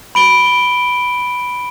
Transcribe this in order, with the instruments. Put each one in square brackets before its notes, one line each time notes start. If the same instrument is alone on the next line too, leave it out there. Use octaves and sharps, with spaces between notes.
[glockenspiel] B5 D7 G7